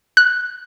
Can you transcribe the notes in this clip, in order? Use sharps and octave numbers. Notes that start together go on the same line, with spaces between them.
F#6